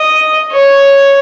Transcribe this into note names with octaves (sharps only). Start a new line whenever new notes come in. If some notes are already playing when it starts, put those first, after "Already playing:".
Already playing: D#5
C#5